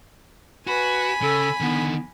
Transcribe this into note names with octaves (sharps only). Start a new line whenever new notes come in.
F#4 B4 G#5 B5
C#3 A4
D3 D#3 B3